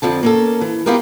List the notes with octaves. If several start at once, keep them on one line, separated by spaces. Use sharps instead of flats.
F2 D3 F3 A5
A#3 C#4 A4
E3
B3 E4 F4 G4 G#4 A#4